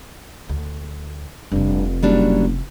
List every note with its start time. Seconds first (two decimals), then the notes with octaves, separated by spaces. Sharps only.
0.49 D2
1.52 F1 G2 C3
2.03 F#1 F#3 G3 D4